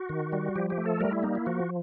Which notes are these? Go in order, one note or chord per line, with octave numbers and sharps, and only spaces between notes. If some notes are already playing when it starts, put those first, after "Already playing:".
Already playing: F#4
D#3
G3
F3 G4
G4
A3
A4
G3 A#4
E4
A#3 D#4
E4
F3 F#4